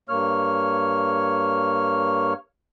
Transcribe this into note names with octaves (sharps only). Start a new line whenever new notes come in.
G2 A#3 C#5 F6